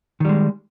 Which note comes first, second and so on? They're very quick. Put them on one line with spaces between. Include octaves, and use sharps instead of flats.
D#3 G3 G#3